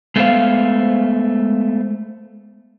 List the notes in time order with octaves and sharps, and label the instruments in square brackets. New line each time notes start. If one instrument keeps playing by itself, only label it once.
[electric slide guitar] G#3 A3 B3 D4 C5 F5